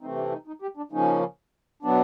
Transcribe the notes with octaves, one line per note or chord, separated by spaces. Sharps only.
C3 E3 A3 C4 D#4
D4
D#4
D#4
G4
D4
C#3 F3 A#3 C#4 D#4
B2 F#3 B3 D4